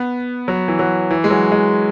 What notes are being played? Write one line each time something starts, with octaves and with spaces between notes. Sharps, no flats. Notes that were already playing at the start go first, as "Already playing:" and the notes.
Already playing: B3
F#3
E3
F#3
E3
G#3
F#3
G#3